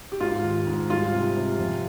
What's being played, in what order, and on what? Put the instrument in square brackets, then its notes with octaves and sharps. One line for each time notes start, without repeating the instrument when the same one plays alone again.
[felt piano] G4
[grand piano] G#2 [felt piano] F4
[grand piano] D#3
G#2
[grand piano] G3 [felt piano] F4
[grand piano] C3
C3
F2